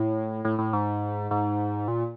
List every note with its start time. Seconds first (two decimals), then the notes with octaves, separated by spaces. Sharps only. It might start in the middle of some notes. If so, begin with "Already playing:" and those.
Already playing: A2
0.45 A2
0.59 A2
0.73 G#2
1.31 G#2
1.88 A#2